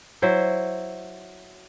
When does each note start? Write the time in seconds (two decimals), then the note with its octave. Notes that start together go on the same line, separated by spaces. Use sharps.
0.22 F#3 E4 C5